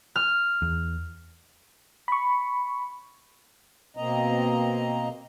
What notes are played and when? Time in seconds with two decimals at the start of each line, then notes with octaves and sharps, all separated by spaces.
0.16 F6
0.62 E2
2.08 B5 C#6
3.97 B2 A#3 C4 D#5 A#5